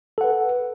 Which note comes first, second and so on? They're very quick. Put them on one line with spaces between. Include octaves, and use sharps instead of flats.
A4 F#5 B4